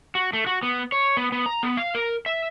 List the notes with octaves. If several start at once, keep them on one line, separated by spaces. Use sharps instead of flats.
F#4
A3
F#4
B3
C#5
B3
B3
A#5
B3
F5
A#4
E5